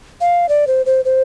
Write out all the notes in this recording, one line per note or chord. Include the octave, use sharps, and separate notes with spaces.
F5
D5
C5
C5
C5